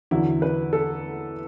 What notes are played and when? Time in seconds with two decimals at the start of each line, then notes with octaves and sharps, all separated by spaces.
0.11 E2 D3 F#3 E4
0.42 B4
0.73 A4